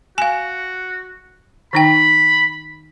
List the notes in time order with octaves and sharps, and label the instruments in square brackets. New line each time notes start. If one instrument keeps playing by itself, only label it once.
[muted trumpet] F#4 [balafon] F5 G#5
[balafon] D#3 D#4 G5 [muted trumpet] B5